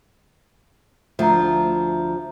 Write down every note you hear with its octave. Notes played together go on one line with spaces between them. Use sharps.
D2 F3 E5 A#5